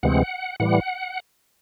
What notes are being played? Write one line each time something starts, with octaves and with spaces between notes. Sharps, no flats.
D2 C3 E3 G#3 C4 F#5
A2 E3 G3 F#5